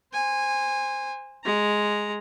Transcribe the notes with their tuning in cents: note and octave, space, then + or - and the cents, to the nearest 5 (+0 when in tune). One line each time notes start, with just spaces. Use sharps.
C5 +0 G#5 -20
G#3 +0 A#5 +0